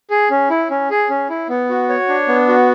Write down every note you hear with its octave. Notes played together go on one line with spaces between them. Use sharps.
G#4
C#4
E4
C#4
G#4
C#4
E4
B3
F#4
C#5
D4
B3
F#4